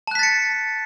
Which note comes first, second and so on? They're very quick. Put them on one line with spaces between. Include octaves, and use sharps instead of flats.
A5 F#6 B6 A6 C#7